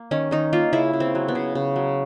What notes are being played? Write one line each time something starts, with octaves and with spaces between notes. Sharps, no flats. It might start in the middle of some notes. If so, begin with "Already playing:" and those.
Already playing: A#3
D#3 C#4
D#3 D#4
A#3 F4
C#3 E4
C#3
C4
F#3
B3
C#3
C#3
F#3